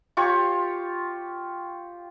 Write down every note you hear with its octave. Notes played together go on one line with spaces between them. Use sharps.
F4 G4 C#5 C#6